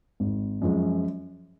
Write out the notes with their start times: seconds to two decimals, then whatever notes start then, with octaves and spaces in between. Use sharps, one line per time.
0.20 G#1
0.62 F#2 F3 G#3